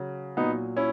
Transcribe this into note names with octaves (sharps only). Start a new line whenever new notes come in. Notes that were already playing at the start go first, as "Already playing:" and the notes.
Already playing: C#3 F#3
A#2 F#3 B3 D#4
C#4 E4